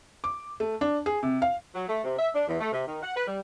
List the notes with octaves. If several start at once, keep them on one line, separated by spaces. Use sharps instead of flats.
D6
A3
D4
G#4
C3
F5
F#3
A3
C3
E5
D4
E2
A3
C3
D#3
F#5
B4
G3